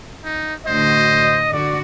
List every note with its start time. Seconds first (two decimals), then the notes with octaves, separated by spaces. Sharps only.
0.24 D#4
0.67 A2 D3 F#4 C5 D#5
1.52 D3 F#4 D5